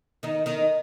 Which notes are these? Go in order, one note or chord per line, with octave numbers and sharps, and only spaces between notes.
D#3 D#4
D#3 D#4